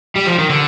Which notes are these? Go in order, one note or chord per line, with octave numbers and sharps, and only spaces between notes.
G3
F3
D#3
D3